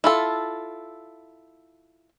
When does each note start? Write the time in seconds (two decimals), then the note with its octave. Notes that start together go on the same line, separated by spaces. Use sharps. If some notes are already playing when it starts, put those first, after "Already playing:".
0.04 E4 F4 A4